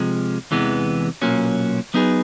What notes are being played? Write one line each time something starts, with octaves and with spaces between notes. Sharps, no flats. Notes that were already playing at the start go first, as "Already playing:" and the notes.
Already playing: C3 F3 G#3
E2 C3 E3 G#3 B3
B1 A#2 F#3 A#3 C#4
F#3 B3 D#4 G#4 B4